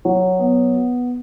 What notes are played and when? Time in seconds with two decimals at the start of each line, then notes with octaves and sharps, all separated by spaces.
0.05 F#3
0.39 B3